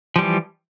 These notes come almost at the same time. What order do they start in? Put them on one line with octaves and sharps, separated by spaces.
F3 G3 E3